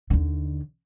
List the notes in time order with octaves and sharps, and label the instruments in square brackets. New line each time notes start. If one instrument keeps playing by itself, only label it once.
[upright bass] D#2 D3